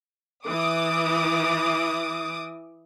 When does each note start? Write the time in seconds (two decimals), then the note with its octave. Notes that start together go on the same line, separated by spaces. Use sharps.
0.47 E3 D6 D#6